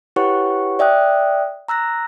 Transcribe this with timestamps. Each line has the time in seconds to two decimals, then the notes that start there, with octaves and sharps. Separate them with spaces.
0.16 E4 G4 B4 C#5 F#5 C#6
0.79 D5 E5 G5 D#6 F#6
1.68 A#5 E6 F#6 A#6